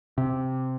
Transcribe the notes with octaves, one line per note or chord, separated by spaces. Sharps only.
C3